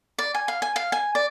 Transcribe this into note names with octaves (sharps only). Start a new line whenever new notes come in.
D5
G#5
F5
G#5
F5
G#5
D5